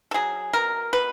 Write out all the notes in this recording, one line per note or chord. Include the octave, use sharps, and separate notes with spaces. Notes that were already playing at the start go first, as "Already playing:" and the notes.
A4
F#3 G#4
B2 A#4
B2 B4